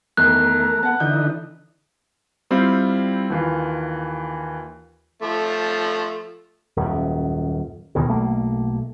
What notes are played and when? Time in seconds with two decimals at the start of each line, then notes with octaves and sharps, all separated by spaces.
0.17 E2 D#3 A3 A#4 F#6
0.83 B3 F#5 A5
1.00 D3 E3 D#4 G6
2.51 G3 C4 E4 F4 C5
3.30 D#2 E3 F4
5.22 F3 A3
6.76 D#1 F#2
7.95 D#2 B2 D#3 E3
8.09 B1 A3 A#3